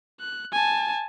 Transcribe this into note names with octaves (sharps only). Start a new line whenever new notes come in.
F#6
G#5 A5